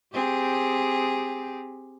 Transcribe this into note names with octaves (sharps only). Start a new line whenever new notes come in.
C4 G4 G#4